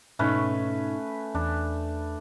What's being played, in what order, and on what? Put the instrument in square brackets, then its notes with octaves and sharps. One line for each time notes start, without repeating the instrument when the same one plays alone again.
[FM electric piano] G#2 B2 D#4 [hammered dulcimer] A3 C#4 B4
[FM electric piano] E2 [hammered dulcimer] D4